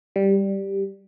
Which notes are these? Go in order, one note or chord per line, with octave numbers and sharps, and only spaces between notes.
G3